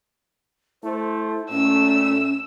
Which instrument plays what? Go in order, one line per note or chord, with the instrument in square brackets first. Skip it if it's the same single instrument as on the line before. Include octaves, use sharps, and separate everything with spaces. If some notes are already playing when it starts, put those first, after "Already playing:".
[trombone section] A3 C5 [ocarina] E4
[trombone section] A#2 A3 [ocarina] C#4 [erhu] E6